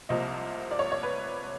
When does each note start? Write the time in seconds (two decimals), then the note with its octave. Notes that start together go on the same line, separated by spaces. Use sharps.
0.09 C2 C3 F3 A#3 D#5
0.71 D5
0.79 C#5
0.92 C#5
1.03 B4